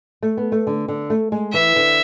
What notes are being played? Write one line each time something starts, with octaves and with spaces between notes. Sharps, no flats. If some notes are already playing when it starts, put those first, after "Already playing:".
A3
B3
A3
D3
D3
A3
G#3
E3 E5
D3